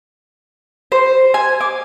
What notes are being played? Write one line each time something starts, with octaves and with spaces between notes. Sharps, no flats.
C5
G#5
D6